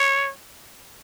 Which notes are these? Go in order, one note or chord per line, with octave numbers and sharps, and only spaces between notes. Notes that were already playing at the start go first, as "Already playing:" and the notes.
Already playing: C#5